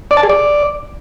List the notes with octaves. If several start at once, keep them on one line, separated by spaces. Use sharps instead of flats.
D5
A5
G#4
D5